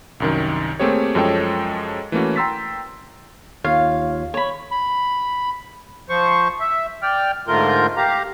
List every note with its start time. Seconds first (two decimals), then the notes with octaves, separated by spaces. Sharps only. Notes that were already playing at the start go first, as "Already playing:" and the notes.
0.20 C2 F#2 D#3
0.79 A3 A#3 C4 G4 G#4 C#5
1.15 F#2 F3 G#3 A4 C#5 G5
2.12 E3 A3 A#3 C#4 F#4
2.36 G5 A#5 C6 E6 A6 B6
3.64 D#2 F4 C#5 F5
4.34 C#5 B5
4.71 B5
6.09 F3 C5 C#6
6.60 E5
7.02 D5 G5 F6
7.48 G#2 D3 A3 F4 A#4 G6
7.97 G4 F5 A#5